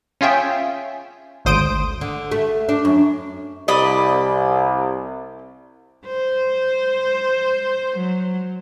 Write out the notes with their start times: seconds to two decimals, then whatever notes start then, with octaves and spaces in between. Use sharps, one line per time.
0.21 C#4 F4 G#4 E5 G5
1.45 G#1 D2 C5 D#6 D7
2.01 D3
2.31 A3
2.69 D4
2.85 F#2
3.68 C2 D5 D#5 B5
6.06 C5
7.97 F#3